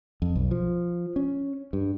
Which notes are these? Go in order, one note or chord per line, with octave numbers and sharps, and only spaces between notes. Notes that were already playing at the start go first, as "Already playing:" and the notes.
F2
B1
F3
C#4
G2